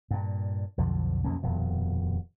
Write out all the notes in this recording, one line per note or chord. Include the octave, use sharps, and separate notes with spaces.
G2 A#2
B1 F2 D3 F3
B1 F2 A#3 C#4
D#1 F2 B2